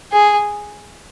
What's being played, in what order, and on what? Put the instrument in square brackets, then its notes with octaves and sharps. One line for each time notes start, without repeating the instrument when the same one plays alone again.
[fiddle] G#4